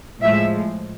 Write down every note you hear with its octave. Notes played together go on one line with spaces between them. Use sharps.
A2 F3 G#3 E5